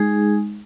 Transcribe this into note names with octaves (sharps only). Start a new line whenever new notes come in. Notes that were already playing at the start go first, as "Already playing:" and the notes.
Already playing: G#3 D#4 G#4